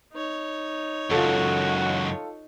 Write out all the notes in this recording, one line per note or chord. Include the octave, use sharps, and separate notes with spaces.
D#4 C#5
C#2 F#2 F4 F#4 A4